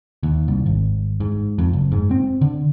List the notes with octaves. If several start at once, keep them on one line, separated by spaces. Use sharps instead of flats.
D#2
C2
G#1
G#2
F2
F#1
G#2
C4
D3